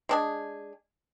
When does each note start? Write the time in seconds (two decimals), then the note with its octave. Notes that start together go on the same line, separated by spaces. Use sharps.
0.09 G#3 D4 G#4